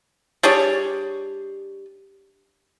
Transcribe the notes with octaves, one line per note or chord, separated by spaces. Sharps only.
G3 D4 G#4 C#5